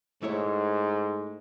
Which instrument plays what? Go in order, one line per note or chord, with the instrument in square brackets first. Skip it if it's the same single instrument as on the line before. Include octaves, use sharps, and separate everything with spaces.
[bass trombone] G#2 [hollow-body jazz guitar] A3 E4 C#5